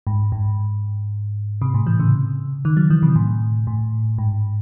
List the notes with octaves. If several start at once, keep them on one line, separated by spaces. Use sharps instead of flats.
G#2
G#2
C3
A2
E3
C#3
D#3
F#3
E3
C3
A2
A2
G#2